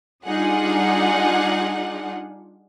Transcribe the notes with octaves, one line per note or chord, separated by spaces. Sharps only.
G3 D4 D#4 F4 G#4 F#5